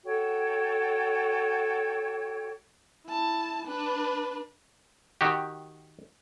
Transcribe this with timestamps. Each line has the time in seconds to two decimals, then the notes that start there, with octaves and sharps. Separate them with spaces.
0.05 F#4 A4 C#5 G5
3.07 E4 A5
3.66 D4 B4
5.21 D#3 F#4 G4